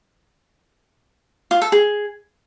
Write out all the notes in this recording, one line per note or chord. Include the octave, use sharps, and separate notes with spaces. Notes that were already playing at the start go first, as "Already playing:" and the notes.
F4
A4
G#4